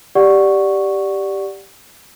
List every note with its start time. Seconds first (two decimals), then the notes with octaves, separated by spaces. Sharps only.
0.15 G4 D5 F#5 C#6